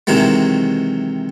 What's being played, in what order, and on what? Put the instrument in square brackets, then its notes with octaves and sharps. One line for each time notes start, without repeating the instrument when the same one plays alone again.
[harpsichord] C3 D#3 E3 F#3 G#3